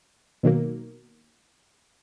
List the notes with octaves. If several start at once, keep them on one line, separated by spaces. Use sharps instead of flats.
B2 D#3 F#3 A#3